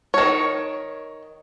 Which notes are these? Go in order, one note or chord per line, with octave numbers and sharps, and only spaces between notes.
D#3 C#5